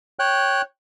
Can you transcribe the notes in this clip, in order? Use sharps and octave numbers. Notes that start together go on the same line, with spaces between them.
C#5 G5 F#6